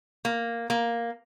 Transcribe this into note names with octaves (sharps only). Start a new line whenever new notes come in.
A#3
A#3